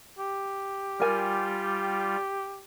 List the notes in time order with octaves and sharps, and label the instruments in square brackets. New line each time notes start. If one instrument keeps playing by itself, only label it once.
[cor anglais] G4
[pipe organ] G3 F4 [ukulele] A#4 G#5